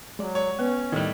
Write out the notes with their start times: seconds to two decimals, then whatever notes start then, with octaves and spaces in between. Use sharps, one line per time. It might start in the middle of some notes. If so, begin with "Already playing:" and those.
0.19 F#3 G#3 D5
0.35 C#5
0.59 B3 C#4 B4
0.92 A2 D#3 G3 D#5 G#6